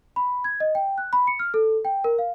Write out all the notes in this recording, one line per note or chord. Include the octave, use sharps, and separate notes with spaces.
B5
G#6
D#5
G5
F#6
B5
C#7
F6
A4
G5
A#4
F5